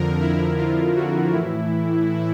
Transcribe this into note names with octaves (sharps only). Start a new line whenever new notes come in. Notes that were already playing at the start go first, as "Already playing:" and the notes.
Already playing: F2 D3 F3 A#4
E4
F4
F#4
A2 E3 E4